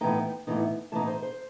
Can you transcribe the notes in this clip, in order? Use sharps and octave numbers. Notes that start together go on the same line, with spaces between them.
A2 E3 B3 D#4 G5
A2 E3 B3 D#4
A2 E3 B3 D#4 A5
C5
C5